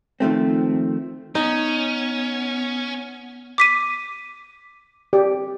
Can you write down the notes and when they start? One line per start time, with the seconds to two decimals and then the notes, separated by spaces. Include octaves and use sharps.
0.20 D#3 F3 A3 C4
1.35 B3 C#4 D#4
3.58 D6 B6 D#7
5.13 G4 D5